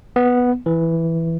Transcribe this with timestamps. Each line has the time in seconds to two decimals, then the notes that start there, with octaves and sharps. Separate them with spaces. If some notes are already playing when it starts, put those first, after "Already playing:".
0.16 B3
0.66 E3